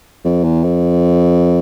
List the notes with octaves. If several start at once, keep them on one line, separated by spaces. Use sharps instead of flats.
F2
E2
F2